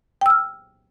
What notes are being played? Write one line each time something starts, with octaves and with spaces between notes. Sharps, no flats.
G5 E6 F6